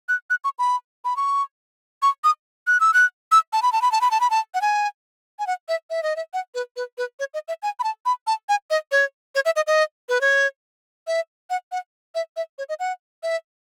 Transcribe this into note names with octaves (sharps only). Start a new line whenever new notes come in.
F#6
F#6
C#6
B5
B5
C#6
C#6
D#6
F#6
E6
F#6
E6
A5
B5
A5
B5
A5
B5
A5
B5
A5
F#5
G#5
G#5
F#5
E5
E5
D#5
E5
F#5
B4
B4
B4
C#5
D#5
E5
G#5
B5
A5
B5
A5
G#5
D#5
C#5
C#5
E5
D#5
D#5
B4
C#5
E5
F#5
F#5
E5
E5
C#5
D#5
F#5
E5